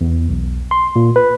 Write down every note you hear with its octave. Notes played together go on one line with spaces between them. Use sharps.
E2
B1
C6
A#2
B4